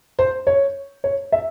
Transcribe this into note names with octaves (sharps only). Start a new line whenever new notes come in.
C5
C#5
C#5
E5